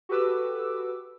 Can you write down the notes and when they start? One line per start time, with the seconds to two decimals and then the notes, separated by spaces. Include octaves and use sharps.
0.09 F#4 G4 A4 B4 D6 E6